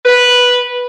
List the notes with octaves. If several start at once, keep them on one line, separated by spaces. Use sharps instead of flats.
B4